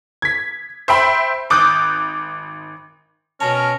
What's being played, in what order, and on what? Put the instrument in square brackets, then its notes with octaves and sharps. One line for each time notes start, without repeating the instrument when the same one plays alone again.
[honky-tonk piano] G#6 B6
C5 E5 G5 B5 C6
G#1 D6 D#6 F#6 G6
[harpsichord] B2 C#5 [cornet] C#4 [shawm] A#4 [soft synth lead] A5